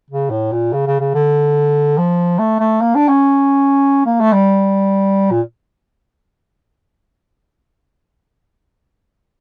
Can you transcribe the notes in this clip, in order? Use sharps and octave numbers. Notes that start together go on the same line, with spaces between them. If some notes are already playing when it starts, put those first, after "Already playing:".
C#3
A2
A#2
C#3
C#3
C#3
D3
F3
A3
A3
A#3
D4
C#4
A#3
A3
G3
A#2